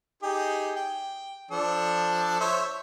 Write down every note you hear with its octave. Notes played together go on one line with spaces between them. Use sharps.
D#4 G4 G#4
G5
F3 D4 A4
C5 C#5 E5